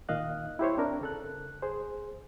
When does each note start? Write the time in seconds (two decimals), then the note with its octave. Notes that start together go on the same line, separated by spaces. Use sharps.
0.09 A#2 D#3 D#5 F5 F#6
0.59 E4 G4 C5 C#5
0.77 C4 D4 A#4
1.01 C#3 A4 F#6
1.62 G#4 C5